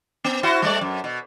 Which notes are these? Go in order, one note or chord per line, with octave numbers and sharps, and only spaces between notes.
B3
E4 F#4 C5
G3 A3 D5
F#2
B2